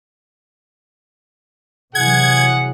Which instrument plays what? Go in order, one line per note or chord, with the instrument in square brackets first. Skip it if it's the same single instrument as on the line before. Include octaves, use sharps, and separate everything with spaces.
[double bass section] C3 E3 F#3 [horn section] G#4 F#5 [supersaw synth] G#6